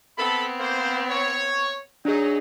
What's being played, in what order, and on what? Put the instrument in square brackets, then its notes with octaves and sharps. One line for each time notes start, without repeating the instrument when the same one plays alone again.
[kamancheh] B3 C4 [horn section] A4 B5
[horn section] A#3 C5
C#5
[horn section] F#3 D#4 [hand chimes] D4 G#4